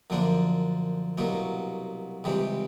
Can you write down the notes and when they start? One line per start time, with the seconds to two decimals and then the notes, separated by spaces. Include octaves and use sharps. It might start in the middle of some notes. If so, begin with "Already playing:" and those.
0.10 F#2 D3 F3 A#3 D4
1.18 C2 B2 F#3 A#3
2.24 C#2 C3 E3 G3